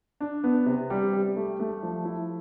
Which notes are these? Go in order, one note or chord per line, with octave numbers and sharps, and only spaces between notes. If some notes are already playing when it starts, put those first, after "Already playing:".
D4
B3
C3
G3
G4
A3
A3
F3
E4